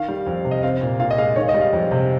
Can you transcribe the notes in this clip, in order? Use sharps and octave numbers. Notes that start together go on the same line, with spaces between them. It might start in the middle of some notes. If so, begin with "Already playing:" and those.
Already playing: D#3 F5
G3
F2
C3
D#5
C4 F5
A#2
A#2 F5
D#5
G#3 F5
D#3 C#5
D#5
G3
F5
F2
C3